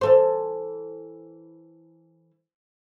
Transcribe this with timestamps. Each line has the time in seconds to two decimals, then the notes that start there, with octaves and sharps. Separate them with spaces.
0.01 E3 A4 C5